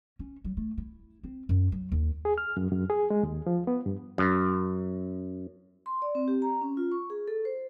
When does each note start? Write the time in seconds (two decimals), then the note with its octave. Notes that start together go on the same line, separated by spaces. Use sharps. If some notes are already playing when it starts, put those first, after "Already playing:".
0.19 C#4
0.44 F#3
0.57 A3
0.78 E4
1.23 C4
1.49 F#2
1.72 F#3
1.92 D#2
2.25 G#4
2.38 F6
2.57 F#2
2.72 F#2
2.90 G#4
3.10 G#3
3.23 D#2
3.47 F3
3.67 B3
3.86 G2
4.18 F#2
5.86 C6
6.02 D5
6.15 C4
6.28 G4
6.42 A#5
6.61 C#4
6.77 F4
6.92 C#6
7.10 G#4
7.28 A4
7.45 C5